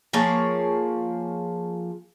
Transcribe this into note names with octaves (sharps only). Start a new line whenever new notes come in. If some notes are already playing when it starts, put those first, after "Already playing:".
F3 A#3 G#4 C#5